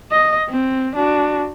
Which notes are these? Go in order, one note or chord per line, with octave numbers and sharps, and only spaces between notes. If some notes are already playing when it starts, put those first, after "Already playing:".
D#5
C4
D4 F#4